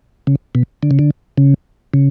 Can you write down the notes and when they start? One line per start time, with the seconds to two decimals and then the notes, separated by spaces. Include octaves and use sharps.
0.27 C#3
0.55 B2
0.83 D3
0.91 C#3
0.99 D3
1.38 C#3
1.94 C#3